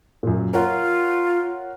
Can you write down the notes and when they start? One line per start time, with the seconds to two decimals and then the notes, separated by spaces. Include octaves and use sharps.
0.23 F#2 A#2
0.53 F4 A#4 C#5 F#5